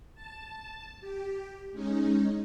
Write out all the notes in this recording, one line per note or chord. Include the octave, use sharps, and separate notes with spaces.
A5
G4
G#3 C#4 D#4